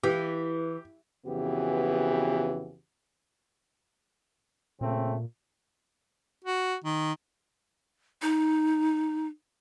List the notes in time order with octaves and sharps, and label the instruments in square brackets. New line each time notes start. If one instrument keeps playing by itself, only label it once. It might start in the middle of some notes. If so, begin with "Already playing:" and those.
[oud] E3 [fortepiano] G4
[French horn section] F2 C#3 E3 B3 F#4 G4
[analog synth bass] A#2 [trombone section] C#3 A3 C4
[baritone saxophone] F#4
D#3
[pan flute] D#4